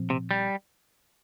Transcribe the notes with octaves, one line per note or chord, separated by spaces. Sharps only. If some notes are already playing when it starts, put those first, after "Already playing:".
Already playing: A#2 F3 C4
C3
G3